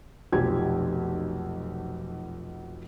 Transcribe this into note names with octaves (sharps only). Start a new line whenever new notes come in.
F1 B1 F3 G4 G#6